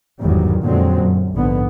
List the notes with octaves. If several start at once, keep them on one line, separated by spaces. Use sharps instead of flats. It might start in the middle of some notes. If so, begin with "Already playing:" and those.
G1 E2 G#2 D#3 F#3 G3
F2 A#2 D3 F#3 G#3 C4
F#2
A#1 G#2 D3 B3